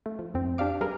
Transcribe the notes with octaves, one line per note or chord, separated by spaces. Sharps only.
A3
F3
F2 C4
D4 G4 D5 F5 D6
G3 G#4 A#4 B4